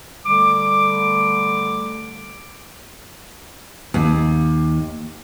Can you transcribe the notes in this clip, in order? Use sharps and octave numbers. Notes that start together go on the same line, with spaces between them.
D3 G3 A3 D6
D#2